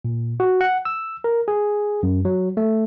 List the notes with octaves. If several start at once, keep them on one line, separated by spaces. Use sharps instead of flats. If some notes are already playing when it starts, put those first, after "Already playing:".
A#2
F#4
F#5
E6
A#4
G#4
F#2
F#3
A3